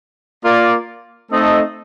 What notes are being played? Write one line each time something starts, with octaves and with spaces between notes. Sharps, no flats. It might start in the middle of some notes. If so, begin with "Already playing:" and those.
A#3 F4 A#4 D5
A3 C4 D#4 A4 D#5